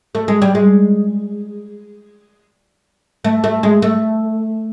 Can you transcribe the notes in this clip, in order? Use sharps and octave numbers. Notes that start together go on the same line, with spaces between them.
A3
G#3
G3
G#3
A3
A3
G#3
A3